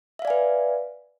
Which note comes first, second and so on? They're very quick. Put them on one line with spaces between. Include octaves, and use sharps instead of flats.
E5 F5 D5 G#5 B4